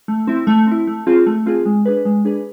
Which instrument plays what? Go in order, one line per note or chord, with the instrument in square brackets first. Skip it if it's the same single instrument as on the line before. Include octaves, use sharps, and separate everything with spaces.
[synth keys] A3
C4 E4
A3
C4 E4
A3
C4 F4 G#4
A3
C4 F4 G#4
G#3
D4 G#4 B4
G#3
D4 G#4 B4